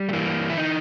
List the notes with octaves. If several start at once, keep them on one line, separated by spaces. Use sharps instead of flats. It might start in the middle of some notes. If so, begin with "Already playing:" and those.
Already playing: G3
A3
E3 A#3
E4
D#4